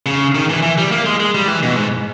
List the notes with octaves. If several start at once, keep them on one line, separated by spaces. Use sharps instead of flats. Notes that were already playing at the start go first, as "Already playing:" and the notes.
C#3
D#3
E3
E3
G3
A#3
G#3
G#3
G3
E3
B2
G#2